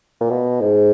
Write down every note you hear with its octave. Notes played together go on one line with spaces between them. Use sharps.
A#2
B2
G#2